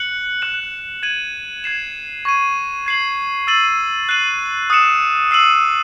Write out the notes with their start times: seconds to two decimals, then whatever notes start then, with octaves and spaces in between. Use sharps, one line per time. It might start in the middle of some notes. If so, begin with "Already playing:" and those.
Already playing: F#6 C#7 F#7
0.42 F#6 C#7 E7
1.03 G#6 D#7 F#7
1.64 G#6 C7 E7
2.25 C#6 G#6 D#7
2.86 G#6 C7 F#7
3.47 E6 A6 D#7 F#7
4.09 F#6 C7 D#7 F#7
4.70 D#6 F#6 C#7 E7
5.31 E6 C7 D#7 F#7